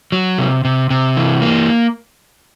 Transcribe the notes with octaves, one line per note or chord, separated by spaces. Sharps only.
F#3
C3
C3
C3
E3
A#3